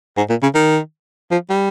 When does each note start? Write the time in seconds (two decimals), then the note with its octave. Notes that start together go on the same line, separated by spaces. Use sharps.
0.17 G#2
0.30 A#2
0.42 C#3
0.55 D#3
1.31 F3
1.50 G3